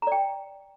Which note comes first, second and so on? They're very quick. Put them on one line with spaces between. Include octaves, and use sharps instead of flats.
A#5 D5 G5